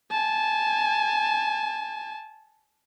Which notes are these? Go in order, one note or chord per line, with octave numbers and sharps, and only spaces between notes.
G#5 A5